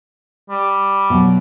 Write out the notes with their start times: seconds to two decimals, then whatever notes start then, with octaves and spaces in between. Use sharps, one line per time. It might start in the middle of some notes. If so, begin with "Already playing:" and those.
0.50 G3
1.10 B2 F#3